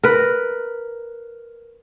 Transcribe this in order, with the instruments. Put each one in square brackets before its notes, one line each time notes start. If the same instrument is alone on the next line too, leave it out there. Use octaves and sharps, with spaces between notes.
[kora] A#4 B4